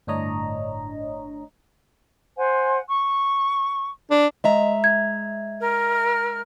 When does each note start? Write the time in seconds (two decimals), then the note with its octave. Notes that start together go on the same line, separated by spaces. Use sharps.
0.07 G1 A2 D4 C#5 D#5 A#5
2.37 C5 F#5 G#5
2.89 C#6
4.11 D4
4.44 G#3 D#5 E5 A#5
4.84 G#6
5.61 A#4 F6